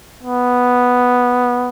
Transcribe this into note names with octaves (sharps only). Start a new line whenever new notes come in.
B3